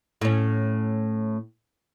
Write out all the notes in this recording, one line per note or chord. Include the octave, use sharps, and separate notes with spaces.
A2 C#4